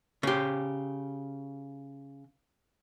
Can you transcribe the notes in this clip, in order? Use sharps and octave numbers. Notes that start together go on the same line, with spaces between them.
C#3 G4